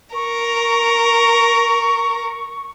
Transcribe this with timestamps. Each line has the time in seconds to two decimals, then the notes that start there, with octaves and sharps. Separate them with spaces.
0.15 A#4 C#6